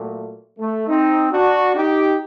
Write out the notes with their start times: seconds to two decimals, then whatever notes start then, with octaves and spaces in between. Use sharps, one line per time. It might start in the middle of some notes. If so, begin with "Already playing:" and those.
Already playing: A#2 F#3 A3
0.59 A3
0.87 C4 D#4
1.32 D4 F#4
1.75 D#4 G4